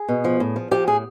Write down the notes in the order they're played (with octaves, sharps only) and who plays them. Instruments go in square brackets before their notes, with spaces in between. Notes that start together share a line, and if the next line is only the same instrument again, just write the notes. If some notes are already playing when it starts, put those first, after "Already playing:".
Already playing: [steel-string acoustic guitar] G#4
B2
F3
A2
F3
F3 G4
A2 G#4